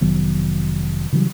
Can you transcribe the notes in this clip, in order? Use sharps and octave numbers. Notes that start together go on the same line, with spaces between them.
F1 D#3 F#3 B3
C#3 E3 F#3 G3